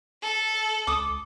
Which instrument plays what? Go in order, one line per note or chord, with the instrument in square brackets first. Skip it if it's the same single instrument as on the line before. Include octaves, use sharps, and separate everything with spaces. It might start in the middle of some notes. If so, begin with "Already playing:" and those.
[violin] A4
[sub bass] C#2 [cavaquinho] D6 D#6